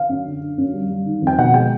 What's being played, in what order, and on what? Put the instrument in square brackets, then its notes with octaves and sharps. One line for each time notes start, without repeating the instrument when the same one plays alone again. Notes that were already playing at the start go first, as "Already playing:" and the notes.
Already playing: [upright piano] F5
F#2
D3
D3
F#2
G3
G3
D#3
F2
G5
B2 F#5
G#3 G5